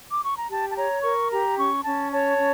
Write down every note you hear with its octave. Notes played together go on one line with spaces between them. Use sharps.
D6
C#6
A#5
G4 A5
A5
C#5 A#5
A#4 C#6
G4 A#5
C#4 C#6
C#4 A5
C#5 A5
C#4